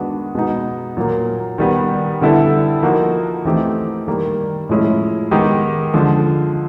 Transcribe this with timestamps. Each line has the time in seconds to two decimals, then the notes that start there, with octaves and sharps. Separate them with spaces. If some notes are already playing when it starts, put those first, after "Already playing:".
Already playing: D#3 G#3 B3 D4 F#4
0.35 B2 G#3 B3 D#4
0.97 A#2 F#3 A#3
1.58 D#3 G3 B3
2.21 D3 G3 B3 E4 A4
2.82 F3 A#3 D#4 F#4
3.45 E3 A3 C4 D#4 G4
4.07 D#3 G3 A#3
4.69 A2 F3 G#3 C#4 E4
5.31 D#3 G#3 B3 D#4 G4
5.94 D3 F3 G#3